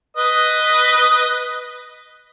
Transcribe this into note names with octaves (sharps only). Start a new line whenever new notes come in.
B4 D#5